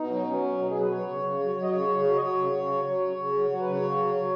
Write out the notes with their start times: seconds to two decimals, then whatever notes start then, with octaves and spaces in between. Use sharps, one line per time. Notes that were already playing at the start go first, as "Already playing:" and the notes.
Already playing: B2 D#4
0.10 F#3
0.27 F#3 C#4
0.43 B2
0.58 B2 D#4
0.70 G#4
0.75 F#3
0.80 B4
0.91 F#3 C#5
1.07 C#3
1.23 C#3
1.39 F#3
1.55 F#3 C#5
1.63 D#5
1.70 C#3 C#5
1.88 C#3
2.03 F#3
2.16 D#5
2.20 F#3 C#5
2.37 C#3
2.52 C#3
2.68 F#3
2.85 F#3 C#5
3.01 C#3
3.17 C#3
3.33 F#3
3.49 F#3 F#4
3.60 C#3 B4
3.70 C#5
3.82 C#3
3.98 F#3
4.14 F#3